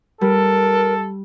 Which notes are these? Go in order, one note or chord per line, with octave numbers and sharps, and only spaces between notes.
G3 A4 A#4